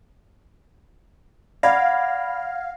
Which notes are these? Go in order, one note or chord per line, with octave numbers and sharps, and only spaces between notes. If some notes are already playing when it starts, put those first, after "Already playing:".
D5 F5 F#5 B5 G#6 A#6